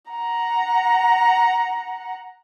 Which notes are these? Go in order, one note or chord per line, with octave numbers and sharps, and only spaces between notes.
F#5 A#5